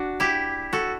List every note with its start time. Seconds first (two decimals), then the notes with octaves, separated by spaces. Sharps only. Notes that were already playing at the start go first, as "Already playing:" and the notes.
Already playing: D4 F#4
0.20 E4 G4
0.73 F#4 A4